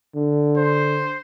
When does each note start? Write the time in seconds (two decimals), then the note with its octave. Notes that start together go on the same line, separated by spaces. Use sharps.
0.15 D3
0.57 C5